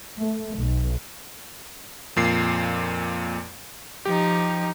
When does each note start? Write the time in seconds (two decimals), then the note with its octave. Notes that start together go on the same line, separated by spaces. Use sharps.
0.18 A3
0.58 B1
2.16 F2 A#2 C7
4.06 F3 D#4 G4